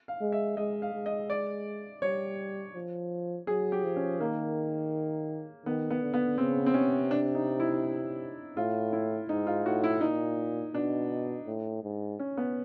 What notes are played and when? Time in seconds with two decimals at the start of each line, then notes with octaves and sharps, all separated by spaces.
0.08 F5
0.21 G#3
0.32 E5
0.57 G#3 D#5
0.82 F5
0.94 G#3
1.06 D#5
1.30 D5
2.02 G3 C#5
2.75 F3
3.47 F#3 G#4
3.72 G4
3.84 F3
3.96 C#4
4.20 D#3 A#3
5.66 D#3 B3
5.90 B3
6.02 D3
6.14 B3
6.38 C#3 C4
6.66 C4
6.74 C3 C#4
7.11 D4
7.35 D#4
7.60 E4
8.57 A2 F4
8.93 E4
9.29 G#2 D#4
9.47 F4
9.65 A2 F#4
9.84 E4
10.01 A#2 D#4
10.74 B2 D4
11.46 A2
11.83 G#2
12.19 C#4
12.37 B3